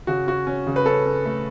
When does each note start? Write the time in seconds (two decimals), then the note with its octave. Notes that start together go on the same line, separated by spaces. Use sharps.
0.07 C#3 F#4
0.27 C#4 F#4
0.47 C#4
0.67 C#3
0.76 B4
0.86 C#4 A4
1.05 C#4
1.25 A3